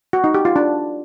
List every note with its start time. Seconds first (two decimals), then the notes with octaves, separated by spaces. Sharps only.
0.13 F#4
0.24 D#4
0.34 G4
0.45 F4
0.56 D4